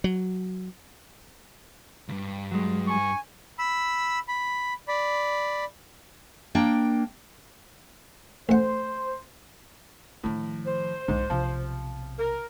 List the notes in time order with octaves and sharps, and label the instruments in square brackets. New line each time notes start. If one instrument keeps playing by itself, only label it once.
[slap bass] F#3
[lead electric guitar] C#2 G2
[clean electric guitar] F#3 G#3
[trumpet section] G#5 C#6
[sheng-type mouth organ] B5 E6
B5
D5 B5
[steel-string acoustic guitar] A#3 D4 G5
[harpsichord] A1 F#5 [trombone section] C5
[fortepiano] A2 [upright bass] D#3 F3
[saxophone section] C5
[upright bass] B1 F2 [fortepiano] G#2
[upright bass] B1 C3 [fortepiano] F3
[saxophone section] A#4